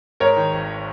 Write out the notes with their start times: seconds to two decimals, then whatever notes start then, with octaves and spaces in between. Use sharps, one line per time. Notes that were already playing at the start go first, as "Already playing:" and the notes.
0.20 G#2 A#4 C#5
0.36 D#3
0.53 G#1